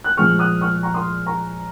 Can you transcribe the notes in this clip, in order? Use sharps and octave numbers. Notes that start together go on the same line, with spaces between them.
F#6
A#2 F3 G#3 C#6 F6
D#6 F#6
C#6 F6
A#5 C#6
C6 D#6
A#5 C#6